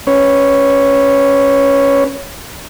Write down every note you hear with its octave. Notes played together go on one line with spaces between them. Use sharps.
C#4 B4 C#5